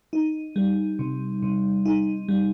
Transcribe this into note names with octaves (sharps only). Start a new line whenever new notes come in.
D#4
G3
C3
C3
D#4
G3